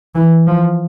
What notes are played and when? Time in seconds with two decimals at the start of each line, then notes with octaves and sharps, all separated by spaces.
0.15 E3
0.46 F3